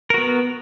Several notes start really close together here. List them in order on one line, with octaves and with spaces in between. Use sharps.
A#4 F#4 B3